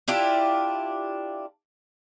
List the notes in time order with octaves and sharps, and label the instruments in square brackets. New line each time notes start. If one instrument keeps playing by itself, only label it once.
[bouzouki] D4 E4 F4 G4